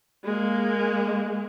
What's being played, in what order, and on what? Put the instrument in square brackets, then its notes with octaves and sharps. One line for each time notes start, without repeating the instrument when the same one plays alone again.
[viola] G#3 A#3